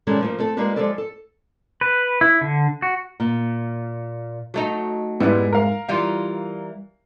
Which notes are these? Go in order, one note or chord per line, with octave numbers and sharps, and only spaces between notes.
A#2 D#3 G3 G#3 C#4 A4
F3 A3 A#3
A3 C4 A4
G#3 A#3 D4 F4 G4 B4
F3 G#3 G4 A4 D5
A4
B4
E4
D3
F#4
A#2
F#3 A3 D#4
F2 G#2 G3 B3 E4
A#4 F5
E3 G3 F4